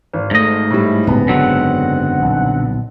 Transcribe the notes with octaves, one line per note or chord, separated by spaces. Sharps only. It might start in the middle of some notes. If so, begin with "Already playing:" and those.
G#1
G#2 A3 D#5
A2 G3
D1 C#2 B3
F#1 G#2 D3 F#3 G#3 C4 F#5
D#1 B1